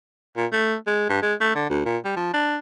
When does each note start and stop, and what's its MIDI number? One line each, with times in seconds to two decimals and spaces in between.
0.37 0.46 46
0.52 0.75 57
0.87 1.08 56
1.09 1.20 43
1.22 1.34 56
1.41 1.54 57
1.55 1.66 50
1.69 1.85 38
1.85 1.97 46
2.04 2.12 55
2.16 2.31 53
2.33 2.57 62